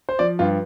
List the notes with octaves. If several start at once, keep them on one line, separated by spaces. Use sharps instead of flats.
C5
F3 D5
G2 F4